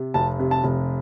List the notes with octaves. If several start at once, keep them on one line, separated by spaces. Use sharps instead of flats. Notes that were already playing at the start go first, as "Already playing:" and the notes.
Already playing: C3
F1 A5
C3
A5
F1